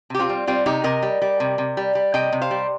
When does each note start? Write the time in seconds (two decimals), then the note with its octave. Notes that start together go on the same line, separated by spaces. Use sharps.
0.10 C3 G4
0.19 C4 F4
0.29 G3
0.47 G3 C4 F4
0.66 C3 D#4 G4
0.84 C3 A#4 D#5
1.02 G3
1.22 G3
1.40 C3
1.58 C3
1.77 G3
1.95 G3
2.14 C3 D#5 G5
2.32 C3
2.41 C5 F5
2.51 G3